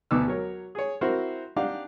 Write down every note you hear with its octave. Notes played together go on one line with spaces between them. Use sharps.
D2 B2 B3 D#4 D6 E6
F#3 A#4 C#5
G#4 C#5
C4 E4 F#4 A#4 C5
D4 D#4 G4 F5 F#5